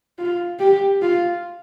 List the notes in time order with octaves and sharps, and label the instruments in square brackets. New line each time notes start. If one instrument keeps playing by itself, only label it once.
[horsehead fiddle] F4
G4
F4